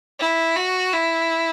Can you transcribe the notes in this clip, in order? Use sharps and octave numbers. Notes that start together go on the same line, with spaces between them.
E4
F#4
E4